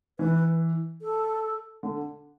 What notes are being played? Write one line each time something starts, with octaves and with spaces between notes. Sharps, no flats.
E3 B4
A4
D3